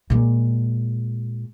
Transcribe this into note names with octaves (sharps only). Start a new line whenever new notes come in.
A#2 G#3